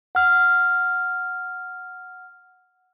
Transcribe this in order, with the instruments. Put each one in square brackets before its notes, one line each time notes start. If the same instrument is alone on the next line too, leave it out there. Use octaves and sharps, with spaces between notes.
[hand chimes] F#5 F6